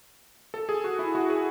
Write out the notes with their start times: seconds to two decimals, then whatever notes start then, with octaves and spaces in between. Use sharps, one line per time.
0.54 A4
0.69 G#4
0.84 F#4
0.99 E4
1.15 F#4
1.30 G#4